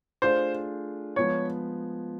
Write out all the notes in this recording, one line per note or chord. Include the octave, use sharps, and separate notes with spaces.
A3 D4 F4 G#4 C5
F3 G#3 B3 C#5